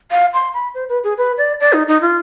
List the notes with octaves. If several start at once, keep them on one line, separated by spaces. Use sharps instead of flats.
F5
C6
B5
C5
B4
G#4
B4
D5
D5
D#4
D#4
F4